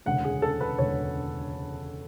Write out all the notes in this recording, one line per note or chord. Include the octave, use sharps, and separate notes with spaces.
E1 D2 C#3 G#3 F#5
G#4
A4
B4
E1 D2 C#3 G#3 C#5